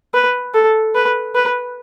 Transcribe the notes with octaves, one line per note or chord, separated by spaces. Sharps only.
B4
A4
B4
B4